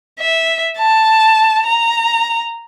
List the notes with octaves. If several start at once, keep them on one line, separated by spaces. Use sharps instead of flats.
E5
A5
A#5